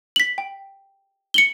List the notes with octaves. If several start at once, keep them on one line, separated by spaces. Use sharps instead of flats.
B6 F#7
G5
C#7 F#7 G7